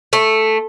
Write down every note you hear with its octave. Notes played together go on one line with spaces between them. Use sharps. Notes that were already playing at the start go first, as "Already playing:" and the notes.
A3